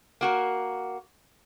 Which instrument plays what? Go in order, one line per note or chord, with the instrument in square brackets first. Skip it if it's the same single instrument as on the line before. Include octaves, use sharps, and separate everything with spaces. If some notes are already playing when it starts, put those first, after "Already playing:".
[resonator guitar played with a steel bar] A#3 F#4 A#4